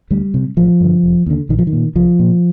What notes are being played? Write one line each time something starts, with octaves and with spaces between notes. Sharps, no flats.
D2 G3
C3
A1 F3
G2 D3
F1
D#2 D3
A#1 D#3
F3
D#3
A#2
C2 F3
A#2